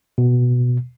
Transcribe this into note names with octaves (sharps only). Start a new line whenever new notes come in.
B2